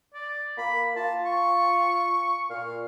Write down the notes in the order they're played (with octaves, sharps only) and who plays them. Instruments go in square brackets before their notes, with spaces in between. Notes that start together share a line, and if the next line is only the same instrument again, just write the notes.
[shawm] D5
[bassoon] A#3 [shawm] B5
[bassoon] F4 [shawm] A5
[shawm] C#6
[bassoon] A#2 [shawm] F5